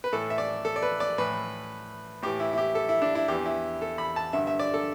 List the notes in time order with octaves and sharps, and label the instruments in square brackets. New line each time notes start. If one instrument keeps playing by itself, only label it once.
[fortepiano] B4
A2 E3 A4
E5
D5
A4
D5
B4
D5
A2 E3 B4
A2 E3 G4
E4
E4
G4
A4
E4
D4
E4
E2 E3 G4
E4
A4
B5
A5
G2 D3 E5
E5
D5
A4